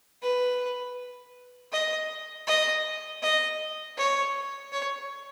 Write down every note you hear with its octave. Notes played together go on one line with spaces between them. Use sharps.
B4
D#5
D#5
D#5
C#5
C#5